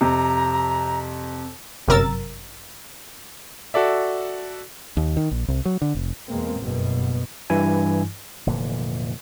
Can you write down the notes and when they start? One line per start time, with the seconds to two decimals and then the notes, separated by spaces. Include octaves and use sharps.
0.01 F2 C3 A#5
1.88 G1 F#2 C3 A#4 E6 A6
3.74 F#4 A4 D5 E5
4.97 D#2
5.17 D#3
5.31 A#1
5.48 C2
5.65 F#3
5.82 D3
5.95 F1
6.27 E2 B2 G#3 A#3 C4
6.59 F#1 G2 B2
7.50 G2 E3 E4 G#5
8.46 F1 A#2 D3 E3